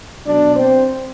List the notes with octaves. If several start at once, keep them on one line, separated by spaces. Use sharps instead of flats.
B2 F#3 D4 D5
C4 C5